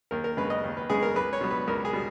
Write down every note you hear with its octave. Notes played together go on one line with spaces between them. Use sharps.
D#2 A#4
A#4
C#3 G#3 B3 B4
D#5
D#2
B4
C#3 G#3 B3 G#4
A#4
C#2 B4
C#5
B2 G3 B3
B4
C#2 A#4
G#4
B2 G3